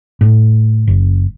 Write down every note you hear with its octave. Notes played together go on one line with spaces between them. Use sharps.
A2
F#1